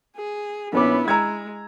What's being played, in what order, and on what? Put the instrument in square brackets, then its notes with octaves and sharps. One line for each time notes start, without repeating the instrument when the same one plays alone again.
[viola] G#4
[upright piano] A#1 C#4 D6 [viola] B3 E4
[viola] G#3 [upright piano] A#5 E6 G#6